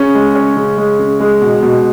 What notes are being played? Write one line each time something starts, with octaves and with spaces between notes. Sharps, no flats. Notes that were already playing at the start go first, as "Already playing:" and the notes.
Already playing: C#3 C#4
G#3
C#4
C#3
G#3
C#3
G#3
B2
B2